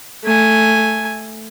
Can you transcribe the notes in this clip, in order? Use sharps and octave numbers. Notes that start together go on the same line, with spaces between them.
A3 G#5